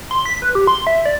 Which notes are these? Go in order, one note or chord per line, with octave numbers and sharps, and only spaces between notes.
C6
B6
B4
G4
C6
E5
D5